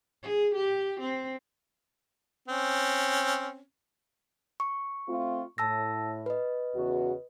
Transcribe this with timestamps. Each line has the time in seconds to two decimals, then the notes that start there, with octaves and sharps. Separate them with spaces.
0.23 G#4
0.55 G4
1.00 C4
2.48 C4 C#4
4.60 C#6
5.07 A3 C4 F4
5.58 A2 A5 E6 A#6
6.26 B4 D#5
6.73 E2 C#3 F#4